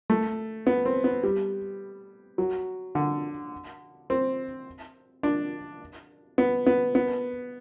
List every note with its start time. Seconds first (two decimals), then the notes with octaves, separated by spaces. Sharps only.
0.10 A3
0.67 B3
0.85 C4
1.04 B3
1.23 G3
2.38 F#3
2.95 D3
4.10 C4
5.23 D4
6.38 B3
6.66 B3
6.95 B3